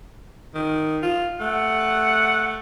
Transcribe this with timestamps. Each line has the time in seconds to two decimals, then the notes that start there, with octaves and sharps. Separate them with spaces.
0.54 D#3
1.03 F4
1.40 A3 F#5